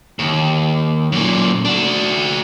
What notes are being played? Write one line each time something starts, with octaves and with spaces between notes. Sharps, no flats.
D#2
F#2 A#2
D4 F#4